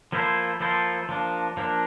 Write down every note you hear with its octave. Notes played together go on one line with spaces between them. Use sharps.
F3 A#3 E4 A4 C5
F3 A#3 E4 A4 C5
F3 A#3 D4
F3 A#3 D4